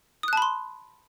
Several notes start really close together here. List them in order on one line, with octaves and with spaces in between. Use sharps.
D#6 F#6 A5 B5 C6